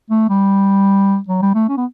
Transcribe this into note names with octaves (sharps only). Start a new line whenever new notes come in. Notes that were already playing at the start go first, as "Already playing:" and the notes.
A3
G3
F#3
G3
A3
C#4
B3